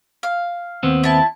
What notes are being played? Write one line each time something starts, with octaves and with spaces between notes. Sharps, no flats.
F5
D#2 B3 C4
E4 A5